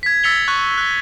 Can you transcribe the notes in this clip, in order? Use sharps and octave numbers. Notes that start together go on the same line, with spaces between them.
G#6 B6
E6 A6 B6 C#7 F7 G7
C#6 F#6
F#6 G7